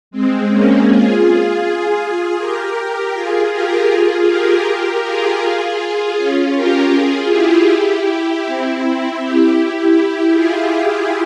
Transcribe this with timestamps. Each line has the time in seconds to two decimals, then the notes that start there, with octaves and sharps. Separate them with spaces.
0.11 G#3 C4
0.49 A#3 C#4
0.87 F4 G#4
1.24 F4 G#4
1.63 F4 G#4
2.38 G4 A#4
3.14 F4 G#4
3.51 G4 A#4
3.90 F4 G#4
4.27 G4 A#4
5.03 F4 G#4
6.17 C#4 F4
6.54 G4 A#4
6.93 F4 G#4
7.30 E4 G4
8.05 E4 G4
8.43 C4 E4
9.19 E4 G4
9.57 E4 G4
9.95 E4 G4
10.32 F4 G#4